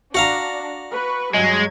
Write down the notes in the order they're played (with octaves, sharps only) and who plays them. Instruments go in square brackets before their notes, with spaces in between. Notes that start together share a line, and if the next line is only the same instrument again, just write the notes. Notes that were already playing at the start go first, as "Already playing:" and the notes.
[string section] D4 [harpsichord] F#4 F5 A#5
[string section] B4 C#6
[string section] G2 F#3 G#6 [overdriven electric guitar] G#3